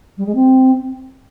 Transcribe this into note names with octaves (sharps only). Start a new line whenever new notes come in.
G3
G#3
C4